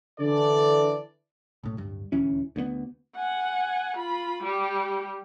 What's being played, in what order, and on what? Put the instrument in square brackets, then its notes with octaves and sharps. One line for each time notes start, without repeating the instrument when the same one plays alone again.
[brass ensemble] D3 E3 A4 D5
[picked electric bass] B1 A2
D1 G2
D#1 D2 E3 C#4
D2 G2 B3
[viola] F#5 G#5
F4 B5
G3 G4